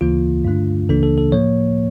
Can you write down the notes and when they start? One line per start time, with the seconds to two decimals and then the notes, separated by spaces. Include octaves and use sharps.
0.01 D2 C#3 E3 A#3 F4
0.44 G2 D3 A3 D4
0.89 C#2 C#3 E3 A#3 D4 A4
1.03 A4
1.18 A4
1.32 A2 F3 A#3 C#5